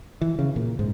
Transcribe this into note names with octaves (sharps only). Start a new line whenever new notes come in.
E3
C#3
A#2
G#2